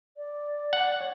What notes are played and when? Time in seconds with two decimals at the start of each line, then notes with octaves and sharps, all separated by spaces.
0.17 D5
0.73 F#5
0.99 C#5